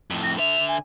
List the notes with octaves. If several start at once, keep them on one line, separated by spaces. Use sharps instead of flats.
F2 A2
A#6
D3 E5 F7
G#5